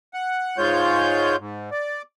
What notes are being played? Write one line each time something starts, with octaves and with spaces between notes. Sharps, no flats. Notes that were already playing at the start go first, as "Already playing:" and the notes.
F#5
G#2 G#3 F4 C#5 G6
G#2
D5